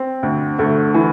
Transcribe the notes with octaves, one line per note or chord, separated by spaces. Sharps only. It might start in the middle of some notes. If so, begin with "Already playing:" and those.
Already playing: C4
D2
D2 A3
E3